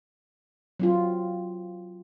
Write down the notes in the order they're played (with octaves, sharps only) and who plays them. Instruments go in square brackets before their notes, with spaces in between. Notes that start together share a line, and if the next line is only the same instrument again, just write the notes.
[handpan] F#3 C4 F4